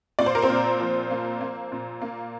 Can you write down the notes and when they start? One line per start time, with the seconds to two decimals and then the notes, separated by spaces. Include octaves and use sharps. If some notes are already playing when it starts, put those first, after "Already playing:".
0.19 A#2 D5
0.26 C5
0.35 A#4
0.42 C4 C5
0.50 A#2
0.80 F3
1.11 A#3
1.41 A#3
1.72 A#2
2.02 A#3